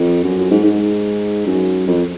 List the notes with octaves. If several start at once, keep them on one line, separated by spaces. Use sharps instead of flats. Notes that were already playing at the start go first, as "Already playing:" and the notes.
Already playing: F2
F#2
F#2
G#2
G#2
F#2
F2